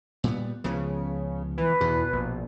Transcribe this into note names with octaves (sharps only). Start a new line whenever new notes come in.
A#2 G3 B3
C#2 C#3 F3 B3
E3 B4
E2 B2
A#1